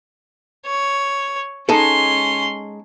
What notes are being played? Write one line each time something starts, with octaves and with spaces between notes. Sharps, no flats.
C#5
G#3 C#4 D#4 A4 C6